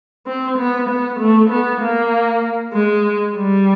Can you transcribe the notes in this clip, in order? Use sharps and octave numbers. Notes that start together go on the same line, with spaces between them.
C4
B3
B3
A3
B3
A#3
G#3
G3